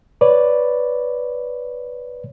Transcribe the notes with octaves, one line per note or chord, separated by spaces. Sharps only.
B4 C#5 D5